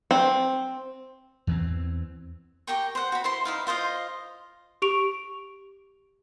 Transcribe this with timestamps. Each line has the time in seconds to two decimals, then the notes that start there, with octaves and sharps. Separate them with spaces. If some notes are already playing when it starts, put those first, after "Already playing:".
0.11 C4
1.47 E2 E3 F3 C4
2.67 G4 A#4 G5 C#6
2.95 C5 F#5
3.12 F#4 B5
3.24 E4 C5 C6
3.45 D#4 E4 F5
3.67 F4 C5 D#5 F5
4.82 G4 C#6 D7 F7